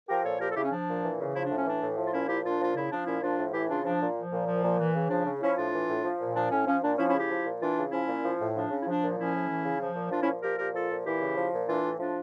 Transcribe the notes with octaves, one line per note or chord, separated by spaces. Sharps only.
F3 G4 A#4
A#2 A4 C#5
F3 G4 A#4
A4
C#3 E4 G4
C#4
F3 D4
A#2
E3
C#3
F3 E4
A2 D4
C#4
E3 D4
A2
F3
F4
A#2 C#4 E4
F3 E4 G4
A#2 D4 F4
F3 F4
C#3 E4
F3 D4
A#2 C#4 E4
F3 D4 F4
A2
E3 E4 G4
C#3 D4 F4
F3 D4
A#2
F3
A#2
F3
A#2
E3
C#3
F3 D4
C#3
F3 C#4 E4
A2 D4 F4
E3
A2
F3
A#2
F3 D4
A2 C#4
F3 C#4
A#2 D4
F3 C#4 E4
C#4 E4
C#3
E4 G4
F3
A#2
E3 D4 F4
C#3
F3 C#4 E4
A#2
F3
A2
F3 D4
C#3
E4
F3 D4
A#2
F3 C#4 E4
A2
E3
C#3
F3
A#2
F3 D4 F4
C#4 E4
A#2
F3 G4 A#4
A#2 G4 A#4
F3 F4 A4
A#2
E3 E4 G4
C#3
F3
A#2
E3 D4 F4
A2
F3 D4 F4